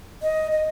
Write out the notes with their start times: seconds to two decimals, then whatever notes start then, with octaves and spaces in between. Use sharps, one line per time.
0.22 D#5
0.51 D#5